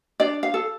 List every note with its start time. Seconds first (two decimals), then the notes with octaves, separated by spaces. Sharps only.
0.20 D4 D5
0.43 F5
0.54 A4